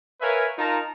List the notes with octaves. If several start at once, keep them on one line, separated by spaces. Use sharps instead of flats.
A#4 B4 C#5 E5 F5 G#5
D#4 F4 A#4 A5 A#5